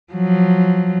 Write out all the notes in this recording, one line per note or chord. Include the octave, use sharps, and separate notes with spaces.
F3 F#3